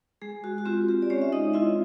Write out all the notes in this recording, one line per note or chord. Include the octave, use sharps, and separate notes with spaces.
G#3 G#4
F#4
F#4
C4 F4 G4
G4
D5
G#3 C#4 C#5
E5
D#4 D#5
C4 E4 F4 E5